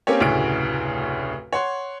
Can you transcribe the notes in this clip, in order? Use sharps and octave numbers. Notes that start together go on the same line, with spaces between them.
A#3 C4 C#4 G4 C#5
F1 D2 A2 C#3 F#4 D7
C#5 F#5 C6